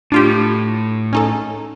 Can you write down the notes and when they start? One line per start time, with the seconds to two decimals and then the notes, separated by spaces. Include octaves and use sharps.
0.12 A2 D4 F4 G4
1.13 C#4 D#4 A4